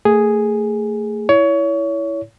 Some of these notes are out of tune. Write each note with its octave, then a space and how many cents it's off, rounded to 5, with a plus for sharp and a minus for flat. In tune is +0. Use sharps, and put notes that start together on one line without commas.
A3 +30 G#4 +0
E4 +0 C#5 +25